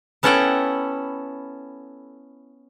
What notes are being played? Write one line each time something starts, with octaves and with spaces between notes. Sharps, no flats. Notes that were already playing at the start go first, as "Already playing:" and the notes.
B3 C#4 E4 A4 F#5 G5